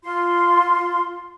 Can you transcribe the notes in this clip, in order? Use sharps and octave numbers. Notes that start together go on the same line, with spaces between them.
F4 C6